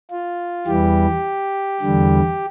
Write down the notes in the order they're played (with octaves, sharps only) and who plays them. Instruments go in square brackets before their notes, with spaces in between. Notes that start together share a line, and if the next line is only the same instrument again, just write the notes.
[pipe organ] F4
E2 E3 G3 G4
E2 D3 G3